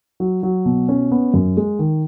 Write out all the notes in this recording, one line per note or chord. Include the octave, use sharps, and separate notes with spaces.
F#3
F#3
B2
C#4
B3
F#2
G#3
D#3